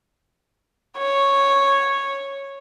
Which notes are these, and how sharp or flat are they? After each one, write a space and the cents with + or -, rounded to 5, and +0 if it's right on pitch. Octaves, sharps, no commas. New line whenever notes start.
C#5 -5